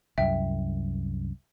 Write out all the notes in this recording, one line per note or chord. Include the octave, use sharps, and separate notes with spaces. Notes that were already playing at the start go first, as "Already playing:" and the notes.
C2 F#2 E5 G5